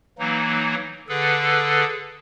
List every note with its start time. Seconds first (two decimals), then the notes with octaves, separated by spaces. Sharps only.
0.19 E3 F#3 A#3 D#4
1.08 D3 G#4 A4 B4